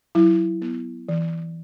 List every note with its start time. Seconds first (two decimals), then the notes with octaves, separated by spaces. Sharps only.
0.15 F#3 E4
0.62 B3
1.09 E3